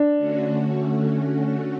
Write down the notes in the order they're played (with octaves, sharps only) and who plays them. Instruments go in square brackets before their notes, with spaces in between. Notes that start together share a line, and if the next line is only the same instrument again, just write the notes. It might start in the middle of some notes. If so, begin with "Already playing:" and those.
Already playing: [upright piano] D4
[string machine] D3 A3 C#4 F#4